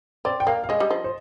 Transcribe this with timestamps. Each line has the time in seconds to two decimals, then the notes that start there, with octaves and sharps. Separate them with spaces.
0.25 C4 D5
0.40 G5
0.47 A#3 F5
0.64 F5
0.69 G#3 D#5
0.80 G3
0.90 F3
1.04 C5